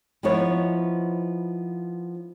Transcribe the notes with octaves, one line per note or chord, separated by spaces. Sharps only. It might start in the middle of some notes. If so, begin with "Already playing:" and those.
F3 B3 D#4 E4 C#5